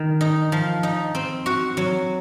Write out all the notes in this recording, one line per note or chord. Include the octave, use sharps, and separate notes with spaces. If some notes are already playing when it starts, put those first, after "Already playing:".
Already playing: D#3
D#4
F3
D#4
C4
F#4
F#3